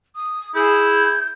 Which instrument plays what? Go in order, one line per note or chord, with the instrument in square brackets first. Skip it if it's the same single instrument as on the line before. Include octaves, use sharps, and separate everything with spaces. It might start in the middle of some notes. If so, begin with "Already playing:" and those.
[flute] D#6
[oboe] E4 [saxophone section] G#4 [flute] G6